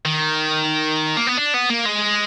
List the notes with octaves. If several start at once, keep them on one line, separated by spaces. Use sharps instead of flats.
D#3
A#3
B3
D4
B3
A#3
G#3